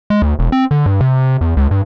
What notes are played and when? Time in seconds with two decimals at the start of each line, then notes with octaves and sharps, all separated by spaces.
0.10 G#3
0.22 D2
0.39 E1
0.52 C4
0.71 D3
0.86 G2
1.01 C3
1.41 E2
1.57 C#2
1.71 G2